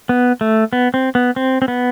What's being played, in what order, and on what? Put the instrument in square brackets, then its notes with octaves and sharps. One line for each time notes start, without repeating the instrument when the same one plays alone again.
[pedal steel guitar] B3
A3
B3
C4
B3
C4
C4
B3